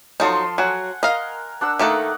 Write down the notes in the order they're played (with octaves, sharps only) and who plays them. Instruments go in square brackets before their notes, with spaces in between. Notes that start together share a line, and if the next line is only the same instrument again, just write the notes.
[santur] F3 A4 C6 [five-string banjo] F#3 D#4
[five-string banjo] F#3 [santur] F#5 G#5
[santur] A#4 [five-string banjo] D#5 F5
[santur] D4 F#5 E6
[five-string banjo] D#3 A3 A4 [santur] A#3 D#4 F#5